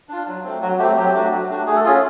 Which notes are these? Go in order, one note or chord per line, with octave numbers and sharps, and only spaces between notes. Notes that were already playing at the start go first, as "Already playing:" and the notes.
D4 F4
F#3
A3 C4
F#3 F#4
A3 C4 G4
F#3 G4
A3 D4 F#4
F#3
A3 D4 F#4
A3 G#4
A4
C#4 F4 G#4